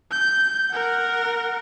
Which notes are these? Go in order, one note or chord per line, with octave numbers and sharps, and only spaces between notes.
G6
A#4 F#5